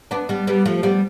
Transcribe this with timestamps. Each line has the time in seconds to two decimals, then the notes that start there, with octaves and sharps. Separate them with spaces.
0.11 B3 D4
0.29 G3 B3
0.47 G3 B3
0.66 F3 A3
0.83 G3 B3